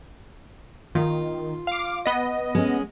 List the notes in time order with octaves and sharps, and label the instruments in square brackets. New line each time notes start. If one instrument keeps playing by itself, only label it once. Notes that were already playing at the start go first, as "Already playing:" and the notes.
[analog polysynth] D#3 [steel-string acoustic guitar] F4
[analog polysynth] F5 D6
B3 D#5
[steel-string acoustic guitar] G#3 C#4